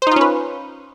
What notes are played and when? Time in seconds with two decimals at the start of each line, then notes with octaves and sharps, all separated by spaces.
0.02 C5
0.07 D#4
0.11 F4
0.16 C#4
0.21 B4